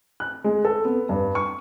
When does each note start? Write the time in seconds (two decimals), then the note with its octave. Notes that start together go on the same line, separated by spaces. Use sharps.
0.20 F#6
0.44 G#3
0.65 A4
0.85 B3
1.09 G2
1.35 C#6